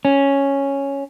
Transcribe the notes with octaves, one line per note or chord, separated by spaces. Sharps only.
C#4